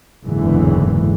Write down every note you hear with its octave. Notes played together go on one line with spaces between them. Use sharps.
F#1 E2 G#2 D3 E3